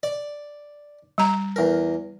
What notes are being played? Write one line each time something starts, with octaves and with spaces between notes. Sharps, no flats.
D5
G3 A#5
E2 A#4